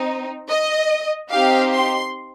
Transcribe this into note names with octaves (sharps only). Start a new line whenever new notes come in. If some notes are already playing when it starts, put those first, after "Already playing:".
Already playing: C4 D#4
D#5
C4 D#4 G4 F5
C6